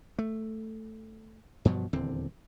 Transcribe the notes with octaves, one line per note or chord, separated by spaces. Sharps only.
A3
G2 B2 F3 F#3
D#1 E2 D3 C4